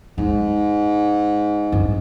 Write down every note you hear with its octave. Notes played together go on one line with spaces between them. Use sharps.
G#2 G#3
G2